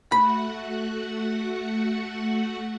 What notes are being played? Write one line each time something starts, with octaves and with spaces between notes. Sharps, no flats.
A3 F#4 F#5 B5